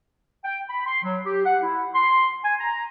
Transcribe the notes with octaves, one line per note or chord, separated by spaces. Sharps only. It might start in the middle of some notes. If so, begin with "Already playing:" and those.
G5
B5
C6
F#3
G4
F#5
E4
C6
G#5
A#5